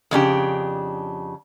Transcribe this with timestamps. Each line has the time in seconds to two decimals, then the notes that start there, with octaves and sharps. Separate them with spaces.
0.11 F2 C#3 D4 G4